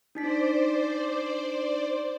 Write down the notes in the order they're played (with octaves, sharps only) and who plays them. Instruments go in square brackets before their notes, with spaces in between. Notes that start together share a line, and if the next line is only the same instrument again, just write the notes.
[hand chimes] D4 D#4 B6 [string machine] C5 D5